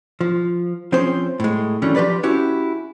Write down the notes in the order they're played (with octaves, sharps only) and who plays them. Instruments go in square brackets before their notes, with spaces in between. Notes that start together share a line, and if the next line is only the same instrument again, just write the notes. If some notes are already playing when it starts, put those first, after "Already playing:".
[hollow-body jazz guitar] F3
F3 C4 C#4 G#4 C5
A2 G#3
D#3 E3 F#3 A3 C#4 D4
F3 G4 B4 D5 B5
C#4 E4 F#4 G4